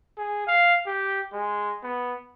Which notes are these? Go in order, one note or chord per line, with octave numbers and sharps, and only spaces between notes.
G#4
F5
G4
G#3
B3